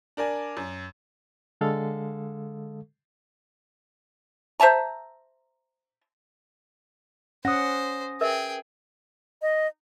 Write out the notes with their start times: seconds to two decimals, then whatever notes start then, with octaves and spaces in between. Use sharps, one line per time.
0.17 D4 A#4 D5 G#5
0.57 F#2
1.61 D3 G#3 A4 F5
4.60 C5 E5 A5 A#5
7.45 C#4 C5 F#5 D#6 A#6
8.21 G#4 A#4 B4 E5 G5
9.42 D#5